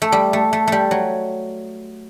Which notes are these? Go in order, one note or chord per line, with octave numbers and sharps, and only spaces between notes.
A3
G3
A3
A3
G3 A3
F#3